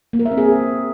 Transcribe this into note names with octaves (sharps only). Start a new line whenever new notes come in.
A#3
A#4
E5
C4
G#4